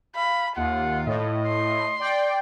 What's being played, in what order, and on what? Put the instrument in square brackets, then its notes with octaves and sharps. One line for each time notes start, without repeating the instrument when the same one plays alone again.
[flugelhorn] F5 [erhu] B5
[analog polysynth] D#2 [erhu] F4 [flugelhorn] F#5
[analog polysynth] A2 [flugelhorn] D#5
[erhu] C6
[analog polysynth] D5 G5